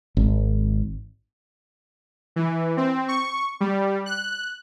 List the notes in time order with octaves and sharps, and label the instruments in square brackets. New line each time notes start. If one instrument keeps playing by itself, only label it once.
[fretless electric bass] G#1
[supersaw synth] E3
C4
C#6
G3
F#6